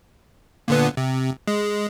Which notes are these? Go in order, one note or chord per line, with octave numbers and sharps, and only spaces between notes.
A#2 D3 B3
C3
G#3